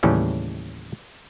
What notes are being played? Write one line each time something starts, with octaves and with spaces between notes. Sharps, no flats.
D#2 A2 C#3 E3 G3 C#4